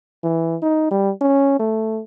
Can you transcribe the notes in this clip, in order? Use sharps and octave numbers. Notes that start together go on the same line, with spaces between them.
E3
D#4
G3
C#4
A3